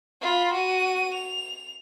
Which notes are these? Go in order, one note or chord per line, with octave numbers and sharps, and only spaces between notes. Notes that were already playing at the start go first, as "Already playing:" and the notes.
F4 B5
F#4 D#7
F7